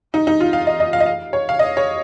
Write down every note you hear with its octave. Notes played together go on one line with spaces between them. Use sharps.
D#4
D#4
F4
F5
D#5
D#5
F5
D#5
F5
C#5
F5
D#5
C#5